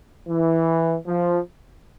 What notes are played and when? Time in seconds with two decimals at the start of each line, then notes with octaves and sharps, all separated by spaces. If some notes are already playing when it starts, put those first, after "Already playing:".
0.28 E3
1.05 F3